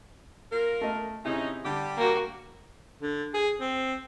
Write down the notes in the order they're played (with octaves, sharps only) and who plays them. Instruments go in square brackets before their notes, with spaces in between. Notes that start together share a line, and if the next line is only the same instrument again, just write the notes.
[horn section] A#3 F4 A#4
[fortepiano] A3 D#5
[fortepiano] C3 E4 G#4 [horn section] C#4 D#4
[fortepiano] D3 [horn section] G3 G4
[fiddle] A#3 F#4
[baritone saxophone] D3
G#4
C4